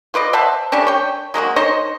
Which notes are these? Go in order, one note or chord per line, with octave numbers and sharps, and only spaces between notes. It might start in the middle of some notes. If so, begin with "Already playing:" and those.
F4 B4 D5 D#5
C5 E5 F#5 A5
G3 A3 C#4 D4
C#5 G5
F#3 G#3 A#3 F#4
D#4 C5 C#5 D#5